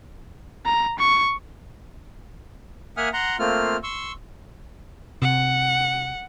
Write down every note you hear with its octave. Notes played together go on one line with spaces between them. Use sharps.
A#5
C#6
A#3 E5 F#5 G#5 D#6 F6
F#5 A#5 C6
A3 A#3 C4 F4 F6
C6 C#6 E6
C3 F#5